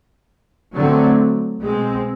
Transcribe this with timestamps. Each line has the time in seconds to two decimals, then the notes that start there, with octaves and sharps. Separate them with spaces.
0.75 D3 F#3 A3 C4
1.63 B2 G#3 C4